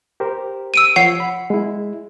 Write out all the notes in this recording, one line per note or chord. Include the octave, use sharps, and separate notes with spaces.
G4 A#4 C5
E6 D7 D#7
F3 C#5 F#5 C7
B5
G#3 E4